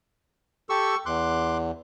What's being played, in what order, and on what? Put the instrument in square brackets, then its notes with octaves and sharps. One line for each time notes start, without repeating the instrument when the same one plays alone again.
[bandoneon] G4 A4 [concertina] C#6 E6
[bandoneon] E2 [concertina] C6 D6 F#6